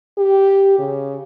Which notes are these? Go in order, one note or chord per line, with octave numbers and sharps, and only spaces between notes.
G4
C#3